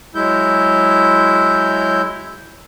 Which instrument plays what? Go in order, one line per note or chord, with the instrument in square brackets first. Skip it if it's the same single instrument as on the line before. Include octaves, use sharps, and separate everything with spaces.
[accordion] F#3 G#3 E4 G6